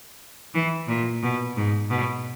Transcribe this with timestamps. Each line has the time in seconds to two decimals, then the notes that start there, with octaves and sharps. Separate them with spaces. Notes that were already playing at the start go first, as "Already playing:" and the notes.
0.54 E3
0.88 A#2
1.23 B2
1.57 G#2
1.90 B2